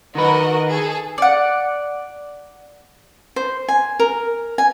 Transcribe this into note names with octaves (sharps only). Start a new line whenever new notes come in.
D#3 F#4 A#4 B4 D#5
G#4 A4
D5 F#5
C5
G#5
A#4
G#5